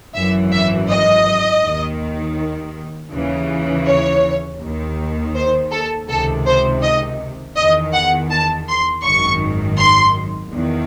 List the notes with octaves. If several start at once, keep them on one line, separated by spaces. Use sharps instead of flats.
G#1 F#2 E3 E5
E5
D#5
D#2 D#3
D#2 C#3 E3
C#5
D#2 D#3
C5
A4
C#2 C3 D#3 A4
C5
D#5
E2 D#3 D#5
F#5
A5
C6
G#1 F#2 D#3 C#6
C6
E2 D#3